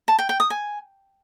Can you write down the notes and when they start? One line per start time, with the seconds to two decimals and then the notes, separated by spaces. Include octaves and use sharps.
0.08 A5
0.19 G5
0.29 G5
0.40 D#6
0.50 G#5